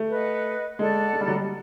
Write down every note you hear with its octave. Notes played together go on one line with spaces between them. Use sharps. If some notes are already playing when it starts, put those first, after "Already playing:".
Already playing: A3
B4 D#5 F#5
G#3 A4 D5 F#5 A5
G#3
G3
F#3
G3